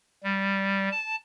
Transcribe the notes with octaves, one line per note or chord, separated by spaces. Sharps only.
G3
A5